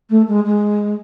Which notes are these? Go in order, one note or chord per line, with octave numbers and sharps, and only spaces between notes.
A3
G#3
G#3